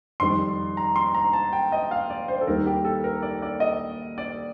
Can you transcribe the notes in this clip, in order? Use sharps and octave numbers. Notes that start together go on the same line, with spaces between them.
F2 D#3 G3 C6
A#5
C6
A#5
A5
G5
D#5
F5
D5
C5
A4
D#2 D#3 G3 A#4
G4
A4
A#4
D5
D5
D#5
D5